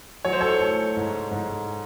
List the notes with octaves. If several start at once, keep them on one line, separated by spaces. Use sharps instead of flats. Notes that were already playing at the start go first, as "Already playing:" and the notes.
F#3 C#5
C5
A4 C#5
A3
G#2
G#2